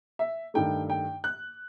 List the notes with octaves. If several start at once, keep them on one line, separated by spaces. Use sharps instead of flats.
E5
G2 D#3 A3 G5
G5
F#6